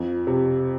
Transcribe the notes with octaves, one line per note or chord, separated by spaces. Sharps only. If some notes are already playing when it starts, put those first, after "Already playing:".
Already playing: F2
C3